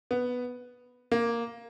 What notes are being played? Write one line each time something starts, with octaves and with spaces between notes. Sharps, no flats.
B3
A#3